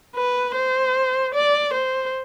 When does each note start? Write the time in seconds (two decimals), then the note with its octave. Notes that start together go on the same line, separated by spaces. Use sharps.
0.16 B4
0.55 C5
1.35 D5
1.74 C5